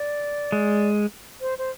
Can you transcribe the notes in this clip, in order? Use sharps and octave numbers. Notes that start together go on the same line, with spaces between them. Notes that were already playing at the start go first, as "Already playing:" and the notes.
Already playing: D5
G#3
C5
C5